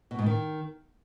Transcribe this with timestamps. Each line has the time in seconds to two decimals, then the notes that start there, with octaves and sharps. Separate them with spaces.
0.11 B2
0.19 G#2
0.26 D#3